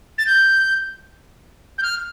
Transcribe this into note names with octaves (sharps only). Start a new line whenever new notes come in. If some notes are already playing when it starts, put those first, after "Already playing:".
A6
G6
G6
F6